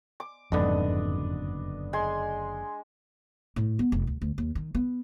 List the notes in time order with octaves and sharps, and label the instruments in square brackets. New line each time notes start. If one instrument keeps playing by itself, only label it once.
[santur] D6
[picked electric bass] F#1 D3 [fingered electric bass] F2 G#2 [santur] B3 D4 D#5
[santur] G#3 G#5 C6
[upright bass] A2
B3
F1
D2
D2
D#2
D#3
B3